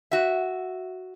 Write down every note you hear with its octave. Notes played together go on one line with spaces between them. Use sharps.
F#4 E5